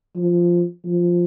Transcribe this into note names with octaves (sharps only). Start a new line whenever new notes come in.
F3
F3